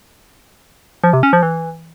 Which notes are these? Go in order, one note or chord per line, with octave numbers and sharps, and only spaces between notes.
F3
C3
C#4
F3
E3